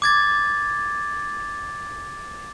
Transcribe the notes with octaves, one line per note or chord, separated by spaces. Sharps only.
D6 G#6 A6